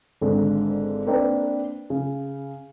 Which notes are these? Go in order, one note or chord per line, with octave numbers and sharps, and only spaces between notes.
G#1 G#2 D3
A#3 C4 D4 A#4 B4
C#3